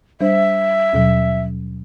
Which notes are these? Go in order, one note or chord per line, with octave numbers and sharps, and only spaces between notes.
G3 D4 C5 E5
D#2 B2 F#3